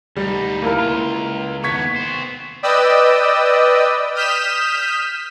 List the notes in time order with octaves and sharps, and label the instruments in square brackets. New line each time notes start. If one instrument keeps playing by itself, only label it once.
[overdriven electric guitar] D2 D#4 [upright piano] G3
[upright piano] A#3 E4 A#4
[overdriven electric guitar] C#2 F4
[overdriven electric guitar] D#2 B3 [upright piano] C#6 G#6 B6
[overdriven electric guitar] B3 C5
[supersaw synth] B4 D5 D#5 G5 D#6 E6
D#6 F6 G6 B6 E7